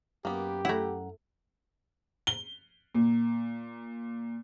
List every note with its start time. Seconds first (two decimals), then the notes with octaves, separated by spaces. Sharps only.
0.25 F#2 A#3 B3 G4
0.65 A3 E4 F#5 A#5
2.27 G7
2.95 A#2